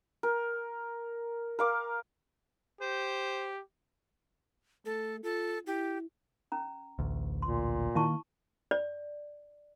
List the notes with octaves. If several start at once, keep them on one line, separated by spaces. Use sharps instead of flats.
A#4
A#4 F5 D6
G4 C5
A3 A4
F4 A4
E4 G4
C#4 A#5
A1 D2
A#2 C6
D#3 A#3 E4 A5 C#6
D5